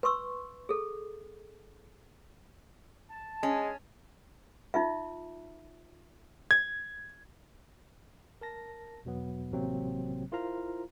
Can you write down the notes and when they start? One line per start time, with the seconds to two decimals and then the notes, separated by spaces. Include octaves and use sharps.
0.03 B4 C6 C#6 E6
0.69 G#4 A4
3.11 A5
3.43 G#3 C#4
4.74 D#4 F4 E5
6.51 G#6
8.41 A#4 A5 A#6
9.05 E2 B2 F#3 B3
9.52 A1 C3 F#3 A#3 C4
10.32 E4 F4 A#4 C5 F5 A#5